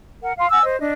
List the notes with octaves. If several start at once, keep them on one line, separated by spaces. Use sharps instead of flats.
A#4 F#5
F5 C6
F#5 G#5 E6
C5 D#5
D4 D#5